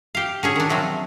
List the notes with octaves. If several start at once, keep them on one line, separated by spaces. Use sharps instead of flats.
G4 F5
D3 C#4 G#4
D#3 D4
C3 F3 F#3 A3